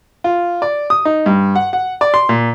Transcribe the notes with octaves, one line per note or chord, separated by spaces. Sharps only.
F4
D5
D#6
D#4
G2
F#5
F#5
D5
C6
A#2